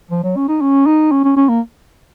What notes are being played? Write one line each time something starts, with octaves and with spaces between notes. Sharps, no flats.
F3
F#3
C#4
D#4
C#4
D#4
C#4
C#4
C#4
A#3